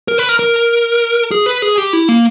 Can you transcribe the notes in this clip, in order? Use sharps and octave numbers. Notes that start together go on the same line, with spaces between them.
A#4
B4
A#4
A#4
G#4
B4
G#4
G4
E4
A#3